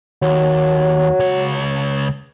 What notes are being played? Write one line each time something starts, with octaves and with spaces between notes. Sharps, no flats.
D#2 F#3
C#2 C#5